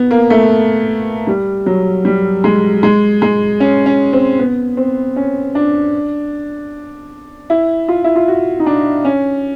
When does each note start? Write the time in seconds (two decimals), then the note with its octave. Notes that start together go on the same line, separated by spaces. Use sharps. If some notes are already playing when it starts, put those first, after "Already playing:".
Already playing: B3
0.11 A#3
0.30 A3
1.27 G3
1.66 F#3
2.05 G3
2.44 G#3
2.83 G#3
3.22 G#3
3.60 C#4
3.86 C#4
4.13 C4
4.39 B3
4.77 C4
5.16 C#4
5.55 D4
7.50 E4
7.88 F4
8.04 E4
8.16 F4
8.28 F#4
8.60 D#4
8.66 D4
9.05 C#4